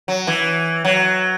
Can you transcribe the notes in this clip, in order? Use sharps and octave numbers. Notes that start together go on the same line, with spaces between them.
F#3
E3
F#3